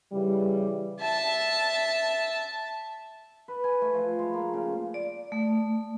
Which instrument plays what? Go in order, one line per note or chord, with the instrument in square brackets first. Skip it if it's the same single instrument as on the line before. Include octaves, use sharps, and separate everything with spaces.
[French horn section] C#3 E3 G3
[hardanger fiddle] E5 A5
[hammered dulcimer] B4
G#5
A3
F3
G#3
A#3
C#3
[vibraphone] D5
A3